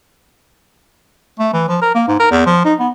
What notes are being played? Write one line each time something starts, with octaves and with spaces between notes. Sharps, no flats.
A3
E3
F3
A#4
A#3
G#2
A#4
E2
F3
D#4
B3